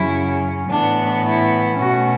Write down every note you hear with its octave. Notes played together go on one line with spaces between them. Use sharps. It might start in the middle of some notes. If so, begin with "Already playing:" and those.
Already playing: F#2 C#3 F#3 C#4 E4
A2 E3 B3 D4
E4
B2 A3 C#4 F#4